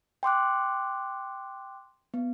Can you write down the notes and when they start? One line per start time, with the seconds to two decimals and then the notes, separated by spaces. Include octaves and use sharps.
0.23 G5 C6 D6 F#6
2.14 B3